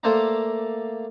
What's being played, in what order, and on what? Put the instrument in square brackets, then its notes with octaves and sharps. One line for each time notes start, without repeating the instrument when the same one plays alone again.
[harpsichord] A3 A#3 A4 C5 D5 A#5